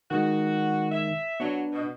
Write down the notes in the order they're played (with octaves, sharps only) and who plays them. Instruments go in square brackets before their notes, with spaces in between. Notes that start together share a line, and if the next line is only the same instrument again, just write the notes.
[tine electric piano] D#3 G#3 [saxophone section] F#4
[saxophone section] E5
[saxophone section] F#3 [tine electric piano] B3 D4
[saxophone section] B2